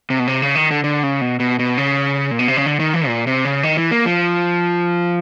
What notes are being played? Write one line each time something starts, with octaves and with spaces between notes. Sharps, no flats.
C3
B2
C3
C#3
D#3
D3
D3
C#3
B2
B2
B2
C#3
A#2
B2
C3
C#3
D3
D#3
E3
A#2
C3
C#3
D#3
E3
A#3
F3